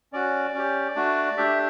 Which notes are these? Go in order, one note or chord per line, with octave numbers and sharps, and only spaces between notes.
C#4 F#4 D5
C#4 G4
A3 D4 F#4
A3 D4 G4 E5